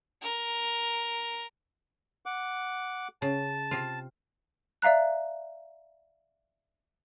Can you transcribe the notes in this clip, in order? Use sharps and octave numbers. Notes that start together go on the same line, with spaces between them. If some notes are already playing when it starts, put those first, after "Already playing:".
A#4
F#5 D6
C#3 A5
C3 F4
D5 E5 F5 A#5 F#6